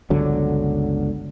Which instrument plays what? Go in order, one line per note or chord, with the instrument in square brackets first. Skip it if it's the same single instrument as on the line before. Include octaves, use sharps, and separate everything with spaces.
[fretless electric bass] G1 C#2 D3 F#3